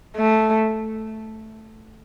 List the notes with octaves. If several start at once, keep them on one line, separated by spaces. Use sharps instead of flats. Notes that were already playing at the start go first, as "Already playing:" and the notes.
A3